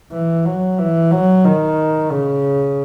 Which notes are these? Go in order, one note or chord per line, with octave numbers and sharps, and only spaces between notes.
E3
F#3
E3
F#3
D#3
C#3